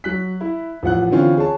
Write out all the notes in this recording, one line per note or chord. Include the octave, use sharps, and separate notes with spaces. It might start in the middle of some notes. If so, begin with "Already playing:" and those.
F#3 F#6 B6
E4
A1 F3 F#5 F#6
D3 E3 C4 C#4 F4
G#4 C#5 A5